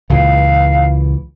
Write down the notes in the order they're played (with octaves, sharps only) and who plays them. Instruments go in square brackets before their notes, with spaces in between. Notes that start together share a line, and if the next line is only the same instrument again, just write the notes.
[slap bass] C#2 A#2 E3 [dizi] F5